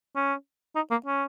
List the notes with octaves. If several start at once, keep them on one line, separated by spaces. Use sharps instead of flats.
C#4
D#4
A#3
C#4